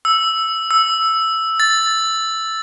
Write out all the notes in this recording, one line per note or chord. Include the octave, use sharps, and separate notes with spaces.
E6
E6
A6